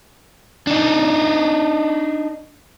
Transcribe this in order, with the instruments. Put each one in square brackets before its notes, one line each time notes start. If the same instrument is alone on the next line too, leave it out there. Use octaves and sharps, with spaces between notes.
[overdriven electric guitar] D4 D#4